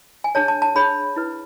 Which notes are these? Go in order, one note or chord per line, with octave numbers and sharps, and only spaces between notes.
G#5
D4 G#4 C#5 A5
A5
A5
D4 G#4 C#5 B5
E4 B4